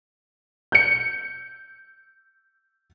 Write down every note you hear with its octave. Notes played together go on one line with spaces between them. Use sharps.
G6 C#7